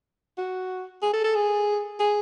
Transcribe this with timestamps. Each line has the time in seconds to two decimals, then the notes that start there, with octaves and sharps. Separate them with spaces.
0.38 F#4
1.02 G#4
1.13 A4
1.24 A4
1.35 G#4
2.00 G#4